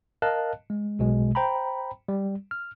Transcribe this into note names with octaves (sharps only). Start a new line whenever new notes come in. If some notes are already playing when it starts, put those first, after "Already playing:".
A#4 D#5 F5 A5 F#6
G#3
B1 B2 G#3
C5 G5 A#5 B5
G3
F6